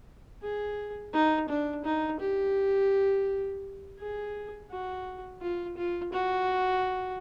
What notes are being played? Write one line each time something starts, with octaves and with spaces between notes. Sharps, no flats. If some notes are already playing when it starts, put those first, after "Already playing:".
G#4
D#4
D4
D#4
G4
G#4
F#4
F4
F4
F#4